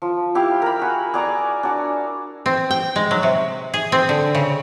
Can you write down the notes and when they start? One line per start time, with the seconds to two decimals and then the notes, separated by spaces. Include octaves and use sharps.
0.02 F3
0.35 E4 G4 F5
0.62 A#4 B5
0.79 F#4 G#4
1.14 G#4 D5 A#5 C#6
1.63 D4 F#4
2.46 C4
2.71 G5
2.96 G#3
3.11 F#3
3.23 C3
3.74 G#4
3.92 C4
4.09 D3
4.35 C#3